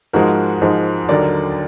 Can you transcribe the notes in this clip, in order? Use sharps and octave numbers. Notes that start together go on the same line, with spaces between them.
G#2 F3 G#3 F#4 A#4
G#2 F3 G#3
D#2 D3 F#3 A#4 D5